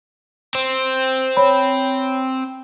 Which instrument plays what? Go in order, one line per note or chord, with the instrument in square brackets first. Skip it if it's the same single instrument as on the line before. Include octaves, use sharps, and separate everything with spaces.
[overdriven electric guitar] C4
[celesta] C#5 B5